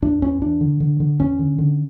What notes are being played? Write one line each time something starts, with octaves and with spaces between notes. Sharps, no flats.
E2 D4
E2 C#4
E2 D4
D3
D3
D3
E2 C#4
D3
D3